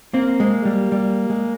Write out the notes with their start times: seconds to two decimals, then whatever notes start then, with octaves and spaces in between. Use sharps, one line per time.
0.13 A#3 C4
0.40 G#3
0.65 G3
0.92 G3
1.30 G#3